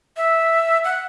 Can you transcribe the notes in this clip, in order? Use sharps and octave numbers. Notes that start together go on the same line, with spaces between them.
E5
F#5